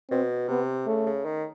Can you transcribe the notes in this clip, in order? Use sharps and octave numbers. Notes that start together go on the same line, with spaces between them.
B2 C4
C3 B3
C#3 A3
C#3
D#3